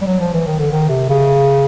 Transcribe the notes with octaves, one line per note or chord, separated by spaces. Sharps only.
G3
F#3
F3
E3
D#3
D3
D#3
C3
C#3